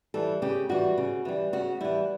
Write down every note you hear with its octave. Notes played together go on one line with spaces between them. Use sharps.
E3 G3 A4
C#3 G4
E3 G3 F#4
C#3
E3 G3
C#3 F#4
E3 G3 E4